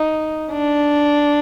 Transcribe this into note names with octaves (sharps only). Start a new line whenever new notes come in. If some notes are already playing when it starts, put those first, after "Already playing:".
Already playing: D#4
D4